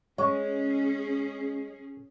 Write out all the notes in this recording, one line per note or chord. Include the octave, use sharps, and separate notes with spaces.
G#3 C#4 G#4 C#5